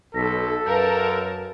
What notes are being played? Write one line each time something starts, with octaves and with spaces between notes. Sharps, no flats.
B1 A4 A#6 B6
F#2 A#4 B4 F5 A5 G6